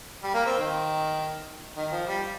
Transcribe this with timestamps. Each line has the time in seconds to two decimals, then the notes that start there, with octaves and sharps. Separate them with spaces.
0.23 G3
0.34 A#3
0.46 C4
0.58 D#3
1.77 D#3
1.92 F3
2.07 G3